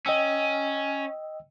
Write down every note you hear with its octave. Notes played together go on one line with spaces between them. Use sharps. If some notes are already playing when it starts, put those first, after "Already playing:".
C#4 D#5 G5 E6